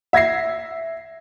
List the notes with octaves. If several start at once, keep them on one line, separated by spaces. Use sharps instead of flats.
E5 G#6 A#6 C7